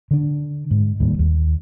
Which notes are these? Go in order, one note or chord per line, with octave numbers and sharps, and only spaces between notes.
D3 D4
G#2
D1 D#2 G3
D#2